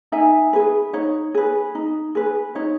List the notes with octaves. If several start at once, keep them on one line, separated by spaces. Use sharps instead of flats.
D#4 E5 G#5
G#4 B4
D#4 C#5
G#4 B4
D#4
G#4 B4
D#4 C#5